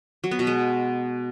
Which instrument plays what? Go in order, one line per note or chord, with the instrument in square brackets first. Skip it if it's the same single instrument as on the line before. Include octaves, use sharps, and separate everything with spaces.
[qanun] F#3
B3
B2
G#3